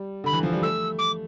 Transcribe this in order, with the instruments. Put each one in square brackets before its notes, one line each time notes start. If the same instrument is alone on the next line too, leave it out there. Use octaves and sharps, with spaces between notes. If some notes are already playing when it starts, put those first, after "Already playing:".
Already playing: [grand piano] G3
[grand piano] D3 [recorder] B5
[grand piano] E3
F3
G3
[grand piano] A3 [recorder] E6
[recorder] D6